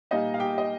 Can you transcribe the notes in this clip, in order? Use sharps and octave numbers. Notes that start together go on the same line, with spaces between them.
A#2 G3 A#3 D#4 D#5
F5
G4 G5
D#5